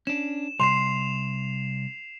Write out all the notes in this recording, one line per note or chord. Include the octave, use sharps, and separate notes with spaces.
C#4 D4 E7
C2 C6 C7 E7 F7